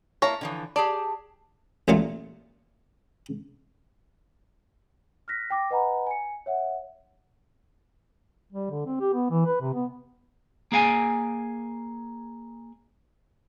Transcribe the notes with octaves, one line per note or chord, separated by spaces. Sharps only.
A#3 E4 C#5 A5 A#5
D3 E3 F3
G4 G#4 D5 A5
A1 A#2 F#3 A3 F4
F6 F#6 A#6 B6
G5 D6 A#6
B4 D#5 F#5 G#5 A#5 B5
G#5 C#7
C#5 E5 F#5
G3
D3
C4
G4
B3
E3
B4
C3
B3
A#3 G#4 F5 G#5